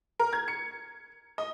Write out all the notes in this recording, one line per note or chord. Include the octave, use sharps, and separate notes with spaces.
A#4
G#6
C#7
D#5